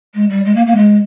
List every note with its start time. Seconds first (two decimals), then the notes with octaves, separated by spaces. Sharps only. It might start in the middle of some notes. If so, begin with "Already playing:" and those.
0.14 G#3
0.30 G3
0.45 G#3
0.55 A#3
0.66 A#3
0.76 G#3